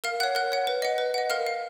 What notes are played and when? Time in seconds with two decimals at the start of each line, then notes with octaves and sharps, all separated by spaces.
0.04 A#4 F5 F6
0.20 F#5 F#6
0.23 C#5
0.35 A#4 F#5 F#6
0.52 C#5 F#5
0.67 B4
0.82 D#5 F#5
0.98 B4
1.14 D#5 F#5
1.30 A#4 F5 F6
1.47 F5